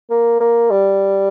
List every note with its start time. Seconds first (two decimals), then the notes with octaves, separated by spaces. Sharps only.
0.10 A#3
0.40 A#3
0.70 G3